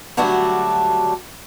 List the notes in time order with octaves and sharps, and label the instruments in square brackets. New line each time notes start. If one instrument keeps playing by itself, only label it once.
[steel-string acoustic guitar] D3 F#3 G3 A3 D4 F#4